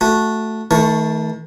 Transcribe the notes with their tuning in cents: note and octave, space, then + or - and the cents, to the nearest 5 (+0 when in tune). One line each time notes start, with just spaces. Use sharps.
A3 +0 F#4 -15
D#3 +40 A3 +0 C#6 +0